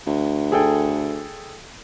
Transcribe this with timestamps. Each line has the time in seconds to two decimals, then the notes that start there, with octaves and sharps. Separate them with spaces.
0.07 D2
0.52 G#4 A4 G5